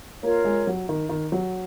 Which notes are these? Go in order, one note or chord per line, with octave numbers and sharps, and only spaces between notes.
A#3 F4 A#4 C#5
G#3
F#3
D#3
D#3
F#3